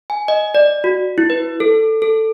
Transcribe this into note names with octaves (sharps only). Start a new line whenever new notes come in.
G#5
D#5
D5
F#4
E4
B4
A4
A4